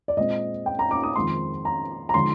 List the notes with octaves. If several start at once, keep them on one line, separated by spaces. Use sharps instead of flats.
D5
A#2 G#3 C4 D#5
G5
A#5
D6
D#6
F2 D#3 G#3 C4 C6
A#5
A#5
D3 F3 G#3 C6